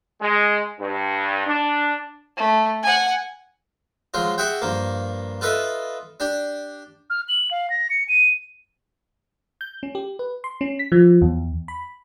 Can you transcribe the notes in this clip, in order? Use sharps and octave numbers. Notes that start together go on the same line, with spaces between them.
G#3
G2
D4
A3
F#5 G#5
F3 F#3 G#3 F4
F#4 G#4 E5 F#5 G5
G2 F3 A#3
F4 A4 B4 D#5 E5
D4 G4
F6
F#7
F5
A#6
C#7
D#7
G6
C#4
G4
B4
C6
C#4
B6
F3
E2
B5